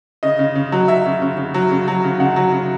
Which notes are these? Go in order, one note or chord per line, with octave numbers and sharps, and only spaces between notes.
C#3 D#5
C#3
C#3
F#3
F#3 E5
C#3
C#3
C#3
F#3
C#3
F#3
C#3
C#3 F#5
F#3
C#3